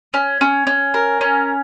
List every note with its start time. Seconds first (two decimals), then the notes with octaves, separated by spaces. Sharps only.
0.14 C#4
0.41 C#4
0.67 C#4
0.94 A#4
1.21 C#4